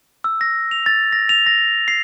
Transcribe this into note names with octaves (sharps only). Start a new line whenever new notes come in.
E6
A#6
F7
A6
A#6
F7
A#6
C7